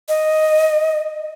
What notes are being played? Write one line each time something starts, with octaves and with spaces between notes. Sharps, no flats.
D#5